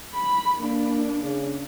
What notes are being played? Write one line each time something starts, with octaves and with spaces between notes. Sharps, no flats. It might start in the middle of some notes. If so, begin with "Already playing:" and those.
B5
A#3 D4
C#3